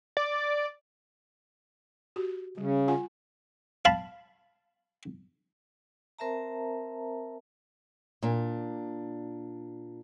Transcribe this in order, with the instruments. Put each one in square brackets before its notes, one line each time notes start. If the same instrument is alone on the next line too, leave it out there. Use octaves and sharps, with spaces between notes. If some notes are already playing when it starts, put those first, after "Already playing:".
[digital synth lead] D5
[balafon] F#4 G4
[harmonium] C#3 [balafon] G3
[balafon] F4 F#5 G#5
[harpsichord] F5 A5 B5
[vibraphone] C4 A#4 C5 E5 A5 A#5
[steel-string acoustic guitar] A#2 D4